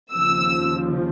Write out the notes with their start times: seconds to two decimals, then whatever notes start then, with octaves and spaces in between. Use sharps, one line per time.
0.13 D#2 C#3 F3 E6